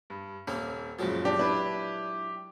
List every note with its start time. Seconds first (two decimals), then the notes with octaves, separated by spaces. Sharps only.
0.10 G2
0.47 D#1 A#3 C4 C#4
0.99 F#1 A#2 F3 F#3 G#3
1.25 D4 G4
1.39 D4 E4 B4